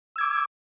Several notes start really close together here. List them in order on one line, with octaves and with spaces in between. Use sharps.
E6 G#6 D6